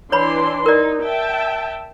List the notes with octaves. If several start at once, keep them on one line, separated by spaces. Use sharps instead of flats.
E3 D4 C#5 B5 C6
D#4 A#4 D5
E5 G5 A5